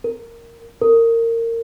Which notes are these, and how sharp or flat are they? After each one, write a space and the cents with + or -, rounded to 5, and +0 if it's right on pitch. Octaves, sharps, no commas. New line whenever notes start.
A#4 -5
A#4 -25